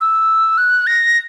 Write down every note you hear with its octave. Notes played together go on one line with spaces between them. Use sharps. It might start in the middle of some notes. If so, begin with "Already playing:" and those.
E6
F#6
A#6